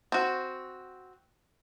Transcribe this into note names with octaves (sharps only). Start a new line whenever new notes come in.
C4 F#4